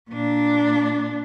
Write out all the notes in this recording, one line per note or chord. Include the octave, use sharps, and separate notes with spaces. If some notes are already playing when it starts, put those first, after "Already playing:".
A#2 D4